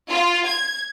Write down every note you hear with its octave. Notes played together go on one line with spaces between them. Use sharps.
F4
G#6